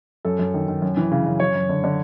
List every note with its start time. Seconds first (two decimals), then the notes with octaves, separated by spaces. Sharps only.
0.25 F#2 A4
0.39 F#2
0.54 D#3
0.68 D#3
0.82 F#2
0.97 E3
1.12 C#3
1.26 F#2
1.40 F#2 C#5
1.55 F#2
1.69 D3
1.84 D3